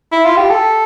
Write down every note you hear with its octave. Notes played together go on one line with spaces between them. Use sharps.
E4
F4
G4
A4